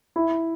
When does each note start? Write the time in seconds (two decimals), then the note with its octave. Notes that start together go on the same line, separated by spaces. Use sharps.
0.16 E4